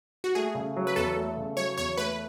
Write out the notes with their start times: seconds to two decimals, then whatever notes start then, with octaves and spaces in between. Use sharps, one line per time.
0.24 F#4
0.35 A3 G#4
0.55 C#3
0.76 F#3
0.87 B4
0.96 E2 A4
1.16 A3
1.37 C#3
1.57 F#3 C#5
1.78 E2 C#5
1.97 A3 B4